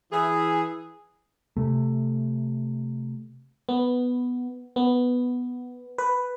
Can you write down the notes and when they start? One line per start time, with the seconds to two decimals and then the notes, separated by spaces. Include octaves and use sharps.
0.12 E3 G#4
1.57 C3 A3
3.69 B3
4.76 B3
5.98 B4